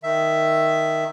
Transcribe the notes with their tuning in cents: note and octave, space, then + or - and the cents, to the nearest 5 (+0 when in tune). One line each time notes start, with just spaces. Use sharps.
D#3 +0 E5 +5